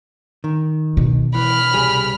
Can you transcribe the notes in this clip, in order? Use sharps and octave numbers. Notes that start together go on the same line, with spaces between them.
D#3
B2
E3 B5 F6
C2 G3 G#4